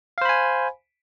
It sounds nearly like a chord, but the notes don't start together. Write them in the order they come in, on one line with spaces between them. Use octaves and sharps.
F5 C5 B5 G#5